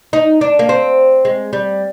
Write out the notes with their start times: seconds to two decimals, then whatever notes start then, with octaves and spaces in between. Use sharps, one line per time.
0.13 D#4
0.41 D4
0.59 A#3
0.69 C4
1.25 G#3
1.53 G3